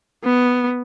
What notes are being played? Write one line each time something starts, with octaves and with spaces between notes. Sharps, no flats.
B3